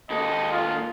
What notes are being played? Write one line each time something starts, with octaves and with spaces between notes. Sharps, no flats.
D#2 A4 D#5
F4